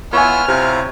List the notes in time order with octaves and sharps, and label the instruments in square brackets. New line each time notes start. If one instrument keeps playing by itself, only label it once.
[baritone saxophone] B3 [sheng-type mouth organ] E4 F4 E6 [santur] C#5 G#5 [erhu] F6
[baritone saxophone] C3 [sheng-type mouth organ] E4 F4 A#5